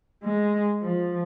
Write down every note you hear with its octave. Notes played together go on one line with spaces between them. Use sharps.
G#3
F3